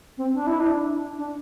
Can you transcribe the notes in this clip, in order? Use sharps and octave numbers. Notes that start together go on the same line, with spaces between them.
C4
D4
E4
D4
D4